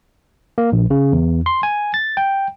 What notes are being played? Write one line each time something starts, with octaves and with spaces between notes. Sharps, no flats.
A#3
A#1
C#3
E2
C6
G#5
A6
G5